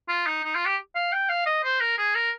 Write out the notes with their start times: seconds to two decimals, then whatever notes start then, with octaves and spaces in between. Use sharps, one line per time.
0.09 F4
0.26 D#4
0.44 D#4
0.55 F4
0.66 G4
0.95 F5
1.12 G5
1.29 F5
1.46 D#5
1.64 C5
1.81 A#4
1.98 G#4
2.15 A#4